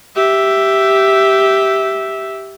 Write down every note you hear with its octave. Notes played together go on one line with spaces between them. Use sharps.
G4 E5